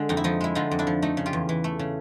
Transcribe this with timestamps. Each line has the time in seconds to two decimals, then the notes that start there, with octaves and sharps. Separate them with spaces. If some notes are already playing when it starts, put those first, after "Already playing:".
Already playing: D3 G#3
0.09 F2 D#4
0.17 E4
0.24 F3 D#4
0.41 G#3 E4
0.55 D3 D#4 F4
0.71 F2
0.79 D4 E4
0.87 F3
1.02 A3 D#4
1.17 C#3
1.26 F4 G4
1.33 E2
1.49 E3
1.64 A3
1.79 C#3